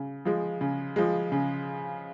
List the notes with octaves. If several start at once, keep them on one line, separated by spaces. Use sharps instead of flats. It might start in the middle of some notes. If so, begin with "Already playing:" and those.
Already playing: C#3
F3 G#3
C#3
F3 G#3
C#3